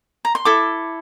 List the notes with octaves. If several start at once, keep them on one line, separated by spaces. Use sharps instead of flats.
A#5
C6
E4 A4 D6